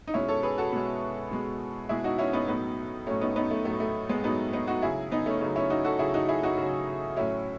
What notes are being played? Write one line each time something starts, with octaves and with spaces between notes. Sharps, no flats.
D#4
B2 G#3 C#4 E4
A4 C#5
G#4 B4
F#4 A4
B2 G#3
B2 G#3
B2 G#3 E4 G#4
D#4 F#4
C#4 E4
B3 D#4
A2 F#3 B3 D#4
A2 F#3 A3 C#4
B3 D#4
B3 D#4
A3
A2 F#3 A3
A3
G#3 B3
A2 F#3 B3 D#4
B3 D#4
D#4 F#4
C#3 F#3 E4 G#4
B3 D#4
A3 C#4
C#3 F#3 B3 D#4
C#4 E4
D#4 F#4
F#4 A4
C#3 F#3 E4 G#4
D#4 F#4
E4 G#4
D#4 F#4
C#3 F#3
A2 F#3 C#4 E4